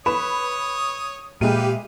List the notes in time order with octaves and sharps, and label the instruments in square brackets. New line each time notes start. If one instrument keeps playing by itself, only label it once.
[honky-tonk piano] B4 B5 E7 [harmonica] C#5 D#6
[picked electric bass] A#2 [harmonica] G3 B4 F5 [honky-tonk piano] G#3 E5 D#7 [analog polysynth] G4